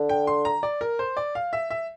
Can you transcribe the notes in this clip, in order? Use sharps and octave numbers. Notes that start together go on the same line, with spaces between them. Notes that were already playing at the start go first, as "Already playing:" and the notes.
Already playing: D3
G5
C6
A#5
D5
A#4
C5
D5
F5
E5
E5